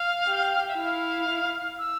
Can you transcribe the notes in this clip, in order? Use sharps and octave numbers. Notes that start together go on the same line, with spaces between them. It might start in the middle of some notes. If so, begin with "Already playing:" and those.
Already playing: F5
G4
E5
E4 F5
E6